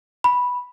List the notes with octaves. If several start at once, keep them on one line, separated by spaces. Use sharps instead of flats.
B5